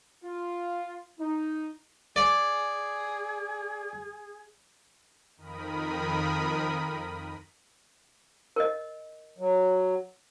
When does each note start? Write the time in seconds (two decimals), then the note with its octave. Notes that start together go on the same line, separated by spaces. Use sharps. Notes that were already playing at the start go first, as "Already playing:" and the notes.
0.24 F4
1.19 D#4
2.16 G#4 D5
5.37 F2 D#3 A#4 B5 D#6
8.56 A#4 D#5
9.38 F#3